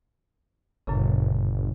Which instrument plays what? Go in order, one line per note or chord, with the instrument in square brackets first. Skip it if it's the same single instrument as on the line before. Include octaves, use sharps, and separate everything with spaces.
[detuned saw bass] G1 [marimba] F#2 A#2 C#3